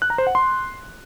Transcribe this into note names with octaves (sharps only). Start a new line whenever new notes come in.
F#6
A#5
C5
F#5
C6